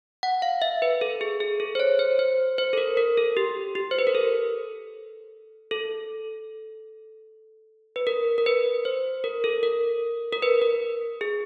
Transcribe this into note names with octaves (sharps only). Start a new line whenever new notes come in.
F#5
F5
E5
B4
A4
G#4
G#4
A4
C5
C#5
C5
C5
C5
A4
A#4
A#4
A4
G4
G4
C5
B4
A#4
A4
A4
B4
A#4
A#4
B4
C5
A#4
A4
A#4
A#4
B4
A#4
G#4